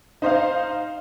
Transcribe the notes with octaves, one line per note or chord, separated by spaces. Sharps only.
D#4 C5 D#5 F5